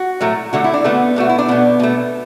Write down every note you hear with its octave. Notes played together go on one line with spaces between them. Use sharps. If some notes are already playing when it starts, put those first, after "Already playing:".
Already playing: F#4
A2 F#3 A3
D3 A3 F#4
E4
D4
D3 A3 B3
B2 A3 F#4
E4
D4
B2 A3 B3
B2 A3